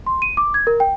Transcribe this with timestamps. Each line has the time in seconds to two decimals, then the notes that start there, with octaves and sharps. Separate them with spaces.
0.07 C6
0.22 D#7
0.37 D6
0.54 G#6
0.67 A#4
0.80 G5